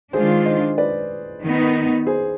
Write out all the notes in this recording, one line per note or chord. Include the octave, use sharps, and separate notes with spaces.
D#3 G#3 D4 F4 G#4 C5
C5 D#5
B4 D5
D#3 B3 D#4
G#4 C5